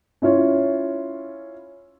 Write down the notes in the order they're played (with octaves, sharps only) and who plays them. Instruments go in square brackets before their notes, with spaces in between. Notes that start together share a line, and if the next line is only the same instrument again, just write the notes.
[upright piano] C#4 E4 F4 C#5